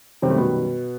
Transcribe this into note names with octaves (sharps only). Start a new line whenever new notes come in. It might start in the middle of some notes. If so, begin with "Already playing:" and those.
F#2 C3 D#3 G3 C4
A3
B2 B3